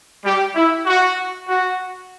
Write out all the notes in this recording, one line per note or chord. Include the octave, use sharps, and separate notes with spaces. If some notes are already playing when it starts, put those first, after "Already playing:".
G3 G4
E4
F#4
F#4